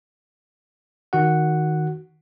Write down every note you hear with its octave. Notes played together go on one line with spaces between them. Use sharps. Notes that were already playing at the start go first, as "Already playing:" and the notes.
D#3 F#4 F#5